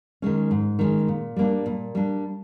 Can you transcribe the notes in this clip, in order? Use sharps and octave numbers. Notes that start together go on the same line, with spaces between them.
D#3 G#3 C#4
G#2
D#3 G#3 C#4
A#2
G3 A#3 D4
A#2
G3 A#3 D4